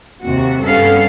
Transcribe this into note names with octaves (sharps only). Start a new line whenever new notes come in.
D#2 C3 F#4
G2 B3 C#4 A4 F5